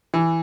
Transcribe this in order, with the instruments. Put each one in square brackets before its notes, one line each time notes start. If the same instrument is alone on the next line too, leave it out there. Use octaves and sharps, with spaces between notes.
[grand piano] E3